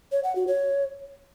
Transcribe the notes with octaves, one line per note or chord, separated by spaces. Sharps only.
C#5
F#5
F#4
C#5